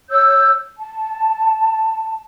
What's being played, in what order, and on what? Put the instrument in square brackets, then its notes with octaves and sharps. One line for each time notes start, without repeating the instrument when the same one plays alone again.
[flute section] C#5 E6 G6
A5